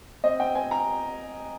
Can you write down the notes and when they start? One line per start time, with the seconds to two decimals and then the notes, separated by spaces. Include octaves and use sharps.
0.24 C4 D#5
0.40 C4 G5
0.55 C4 G#5
0.71 A#5